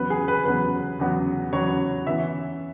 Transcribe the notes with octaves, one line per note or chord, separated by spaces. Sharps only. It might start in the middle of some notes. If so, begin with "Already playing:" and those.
Already playing: E2 C#3 F#3 B3 B4
G#4
B4
E2 C#3 F#3 B3 B4
E2 C#3 F#3 B3
E2 C#3 F#3 B3 C#5
F#2 E3 B3 E5